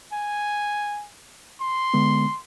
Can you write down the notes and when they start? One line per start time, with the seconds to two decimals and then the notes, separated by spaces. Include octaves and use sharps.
0.13 G#5
1.61 C6
1.94 D3 G#3 B3